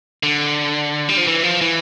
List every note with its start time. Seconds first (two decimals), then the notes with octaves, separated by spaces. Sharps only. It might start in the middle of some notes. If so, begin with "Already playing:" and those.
0.23 D3
1.09 G3
1.17 F3
1.27 E3
1.43 F3
1.61 E3